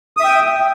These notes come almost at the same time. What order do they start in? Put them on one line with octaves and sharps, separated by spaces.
D#6 E5 G5